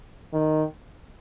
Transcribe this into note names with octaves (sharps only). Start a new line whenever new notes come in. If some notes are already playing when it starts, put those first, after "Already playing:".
D#3